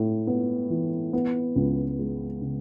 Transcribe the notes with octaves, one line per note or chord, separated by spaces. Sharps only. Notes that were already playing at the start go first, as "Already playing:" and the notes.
Already playing: A2
B3
E3
B3
C#2
G#3
C#3